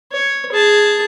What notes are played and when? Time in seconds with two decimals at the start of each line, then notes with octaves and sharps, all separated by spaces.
0.12 C#5
0.52 G#4 A5